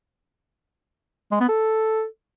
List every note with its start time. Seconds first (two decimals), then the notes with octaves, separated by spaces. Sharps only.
1.32 G#3
1.40 B3
1.49 A4